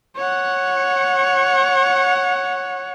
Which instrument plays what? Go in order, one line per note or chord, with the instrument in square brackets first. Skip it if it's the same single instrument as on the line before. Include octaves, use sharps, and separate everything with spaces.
[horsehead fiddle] C#5 F#5